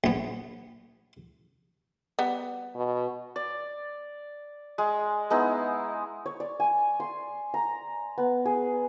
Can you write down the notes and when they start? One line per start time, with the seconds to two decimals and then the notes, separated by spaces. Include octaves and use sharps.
0.04 A#1 B3
2.19 G3 B3
2.76 B2
3.36 D5
4.78 G#3
5.30 G#3 B3 D#4 E4
6.26 C#5
6.40 D5
6.60 G#5
7.00 C6
7.54 A#5
8.18 B3
8.45 G#4